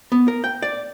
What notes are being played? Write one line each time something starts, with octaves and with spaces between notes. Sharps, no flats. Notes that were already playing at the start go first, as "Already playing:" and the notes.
B3
A#4
G5
D5